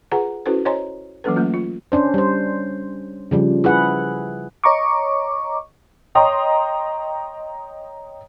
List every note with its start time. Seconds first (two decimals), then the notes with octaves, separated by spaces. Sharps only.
0.11 F4 G#4 B4 F#5 G#5 A#5
0.46 C#4 E4 F#4 A4 B4 C5
0.65 C5 C#5 D#5 G#5 A#5 C6
1.24 E3 F#3 A#3 C#4 A4 B4
1.36 F#3 A3 A#3 C#4 F4
1.54 F4
1.92 C#4 D4 C5
2.14 G3 C5
3.31 C#3 F3 G3
3.64 E4 G#4 B4 F#5
4.64 C#5 D#5 A#5 C#6 D6
6.15 C#5 D#5 G5 A#5 C6 D#6